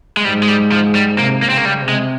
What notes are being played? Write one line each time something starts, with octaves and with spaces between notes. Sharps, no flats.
G#3
G#2 G3
G#3
G3
F3
G3
C3 A#3
A#3
C#3 C4
A#3
G3
C3
G#3